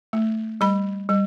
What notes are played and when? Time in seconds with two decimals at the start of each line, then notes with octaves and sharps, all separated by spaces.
0.13 A3
0.61 G3 B5
1.09 G3